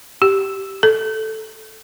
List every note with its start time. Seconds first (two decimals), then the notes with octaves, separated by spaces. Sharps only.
0.22 G4
0.83 A4